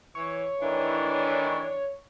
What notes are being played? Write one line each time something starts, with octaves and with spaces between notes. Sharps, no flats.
E3 C#5
A2 D#3 E3 D4